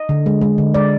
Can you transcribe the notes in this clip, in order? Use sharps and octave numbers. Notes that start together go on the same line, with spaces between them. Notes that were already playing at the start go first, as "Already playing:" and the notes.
Already playing: D#5
D3
G#3
G#3
D3
G#3 D5